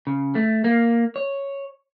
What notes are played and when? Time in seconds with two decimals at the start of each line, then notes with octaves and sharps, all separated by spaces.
0.07 C#3
0.35 A3
0.64 A#3
1.16 C#5